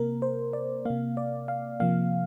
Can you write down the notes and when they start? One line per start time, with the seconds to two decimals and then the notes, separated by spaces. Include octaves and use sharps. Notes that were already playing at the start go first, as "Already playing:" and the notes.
Already playing: C3 A#3 A#4
0.22 C5
0.53 D5
0.85 C3 A#3 F5
1.17 D5
1.48 F5
1.80 C3 F3 A#3 F5